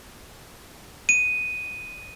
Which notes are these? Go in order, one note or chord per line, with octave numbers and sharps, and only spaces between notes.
D#7